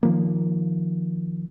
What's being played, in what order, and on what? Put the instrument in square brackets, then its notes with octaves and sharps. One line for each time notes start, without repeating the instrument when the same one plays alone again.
[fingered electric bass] D#3 F3 A#3